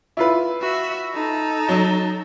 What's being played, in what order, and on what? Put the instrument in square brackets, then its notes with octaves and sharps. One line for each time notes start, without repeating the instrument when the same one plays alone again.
[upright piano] E4 F4 B4
[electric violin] F#4 E5
D#4 A4
[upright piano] F#3